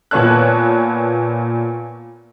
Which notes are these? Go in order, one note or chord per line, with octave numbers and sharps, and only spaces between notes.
A#2 B3 C#5 A5 F#6